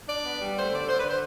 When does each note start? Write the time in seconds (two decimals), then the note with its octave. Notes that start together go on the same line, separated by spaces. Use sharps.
0.08 D4 D5
0.24 B3
0.41 G3
0.56 A3 C5
0.71 D3 D5
0.87 D3 C5
0.98 B4
1.03 D3
1.08 C5